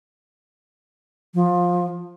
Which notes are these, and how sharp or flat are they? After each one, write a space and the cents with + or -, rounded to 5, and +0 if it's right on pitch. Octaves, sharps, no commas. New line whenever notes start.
F3 +20